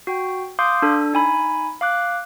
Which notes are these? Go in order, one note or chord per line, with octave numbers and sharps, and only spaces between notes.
F#4 G5
F5 C6 D6 D#6 G6
D4 A4
D#4 G#5 B5
F5 D6 F#6